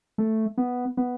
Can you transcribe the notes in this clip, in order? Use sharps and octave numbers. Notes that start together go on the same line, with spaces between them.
A3
B3
B3